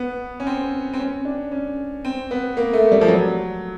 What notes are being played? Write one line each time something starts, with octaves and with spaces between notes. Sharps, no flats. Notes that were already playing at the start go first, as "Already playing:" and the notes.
Already playing: B3
C#4
C4
C4
C#4
D4
C#4
C4
B3
A#3
A3
G3
F3
F#3